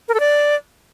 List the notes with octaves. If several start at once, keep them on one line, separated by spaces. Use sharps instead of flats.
A#4
A4
D5